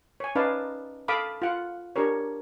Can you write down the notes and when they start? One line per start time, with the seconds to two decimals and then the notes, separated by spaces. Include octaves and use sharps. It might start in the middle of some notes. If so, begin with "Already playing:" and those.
0.20 C#5 G#5
0.35 C#4 D#4 B4 D5 F5 A5
1.08 A4 F5 A5 B5 D6 D#6
1.42 F4 F#5
1.96 D4 G4 A#4 C#5